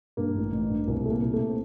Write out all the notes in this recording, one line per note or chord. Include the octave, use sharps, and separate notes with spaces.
G2 A#3
A1
A1
G2
C2 A#3
A#2 A3
A#3
C2
A3
C4